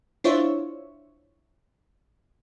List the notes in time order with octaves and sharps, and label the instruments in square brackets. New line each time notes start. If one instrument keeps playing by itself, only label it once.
[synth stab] D4 E4 F4 C5 C#5 E5